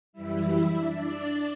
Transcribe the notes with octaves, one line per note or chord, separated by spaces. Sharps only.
F#2 E3 G3 E4 E5
D4 D5